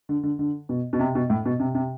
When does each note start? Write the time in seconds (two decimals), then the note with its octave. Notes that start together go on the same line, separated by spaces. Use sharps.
0.09 D3
0.23 D3
0.39 D3
0.69 B2
0.93 B2
0.99 C3
1.15 B2
1.30 A2
1.45 B2
1.60 C3
1.75 C3